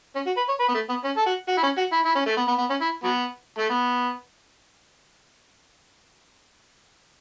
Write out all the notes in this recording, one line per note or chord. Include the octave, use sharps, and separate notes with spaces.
C#4
F#4
B4
C#5
B4
B3
A3
B3
C#4
A4
F#4
F#4
E4
C#4
F#4
E4
E4
C#4
A3
B3
B3
B3
C#4
E4
F#3 B3
A3
B3